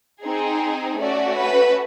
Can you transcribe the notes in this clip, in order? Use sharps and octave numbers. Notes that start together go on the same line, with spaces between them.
C4 D#4 G#4
A3 C#4 F#4 D5
B4